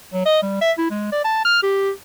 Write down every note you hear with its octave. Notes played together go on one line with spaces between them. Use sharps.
F#3
D#5
G3
E5
E4
G#3
D5
A5
F6
G4